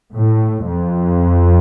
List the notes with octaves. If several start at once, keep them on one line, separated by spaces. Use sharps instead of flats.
A2
F2